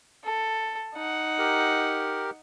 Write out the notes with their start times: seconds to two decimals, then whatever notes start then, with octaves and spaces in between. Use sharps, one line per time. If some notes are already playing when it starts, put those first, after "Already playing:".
0.24 A4
0.95 D#4 F#5
1.38 G4 A#4